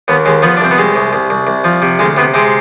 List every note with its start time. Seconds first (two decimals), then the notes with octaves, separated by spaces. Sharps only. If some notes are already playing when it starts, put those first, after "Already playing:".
0.08 D#2 B3
0.25 D#2 G#3
0.42 F3 B3
0.57 D4
0.61 C2 C4
0.71 B3
0.77 C2 G#3
0.96 C2
1.13 C2
1.30 C2
1.47 C2
1.64 F3
1.82 C3
1.99 D2 G#3
2.17 C3 B3
2.34 C3 G#3 C4